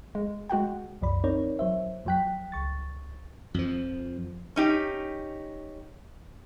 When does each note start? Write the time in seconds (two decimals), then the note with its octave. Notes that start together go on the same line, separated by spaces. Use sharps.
0.15 G#3
0.50 G#3 F#4 F#5 G5
1.02 C2 F#2 F3 D5 B5
1.24 C4 D#4 A#4 C#5 D5
1.59 F#3 C5 E5
2.05 F2 F3 F#3 G5 F#6 B6
2.52 C#2 C#6 A6
3.54 F2 F3
4.56 C#4 D#4 G4